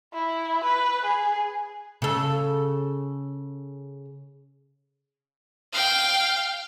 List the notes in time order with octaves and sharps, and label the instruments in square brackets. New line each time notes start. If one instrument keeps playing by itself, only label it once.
[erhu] E4
B4
G#4
[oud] C#3 A4
[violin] F5 G5